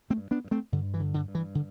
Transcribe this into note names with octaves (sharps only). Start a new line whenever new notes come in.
A3 C4
G2
B3 D4
G2
A3 C4
G2 D3
E3
D3
D3
G2
E3
D3